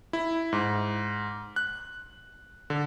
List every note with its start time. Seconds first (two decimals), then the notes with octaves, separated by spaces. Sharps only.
0.13 E4
0.53 G#2
1.56 F#6
2.70 D3